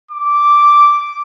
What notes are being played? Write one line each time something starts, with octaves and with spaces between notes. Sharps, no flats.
D6